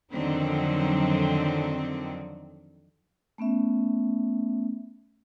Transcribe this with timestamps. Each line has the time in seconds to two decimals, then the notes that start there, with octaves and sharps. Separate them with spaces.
0.12 F2 D3 D#3 F#3 C4
3.38 A3 B3 C#4 E5